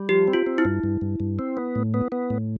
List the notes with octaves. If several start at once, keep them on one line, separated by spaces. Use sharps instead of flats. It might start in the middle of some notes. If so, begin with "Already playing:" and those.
Already playing: G3
F3 G4
C4
F4
C4
E4
G2
G2
G2
G2
C4
B3
A2
B3
B3
A2